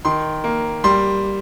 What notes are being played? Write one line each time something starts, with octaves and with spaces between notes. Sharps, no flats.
D#3 C6
A#3
G3 C6